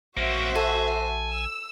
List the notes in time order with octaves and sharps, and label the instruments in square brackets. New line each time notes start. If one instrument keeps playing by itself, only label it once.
[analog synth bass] A#1 [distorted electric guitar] A#3 C#4 [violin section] F#4 C5 E5
[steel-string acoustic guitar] A4 [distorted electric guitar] G#5
[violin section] E6